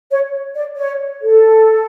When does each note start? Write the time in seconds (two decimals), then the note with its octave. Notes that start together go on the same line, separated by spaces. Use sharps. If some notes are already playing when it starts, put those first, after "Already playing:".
0.10 C#5
0.55 D5
0.77 C#5
1.22 A4